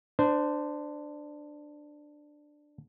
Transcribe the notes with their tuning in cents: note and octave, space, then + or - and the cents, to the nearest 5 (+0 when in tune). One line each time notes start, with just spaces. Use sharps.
D4 +10 C5 -20